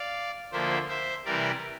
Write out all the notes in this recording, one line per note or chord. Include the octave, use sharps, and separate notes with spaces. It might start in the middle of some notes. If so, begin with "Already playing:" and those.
Already playing: D5 F5
D2 D3 F3 A#3 C5 E5
C5 E5
C3 E3 G3 A#4 D5